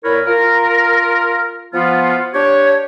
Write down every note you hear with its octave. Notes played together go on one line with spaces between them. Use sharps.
A#2 E4 A#4 B4 C#5
F4 A#4
F3 B3 F4
D4 G4 C#5